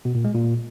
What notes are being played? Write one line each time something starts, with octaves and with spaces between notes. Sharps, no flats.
B2
A#2
G#3
A#2